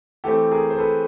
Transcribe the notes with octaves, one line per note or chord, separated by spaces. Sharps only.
E3 A3 C4 G4 A4
G#4 A#4
C5
A4 B4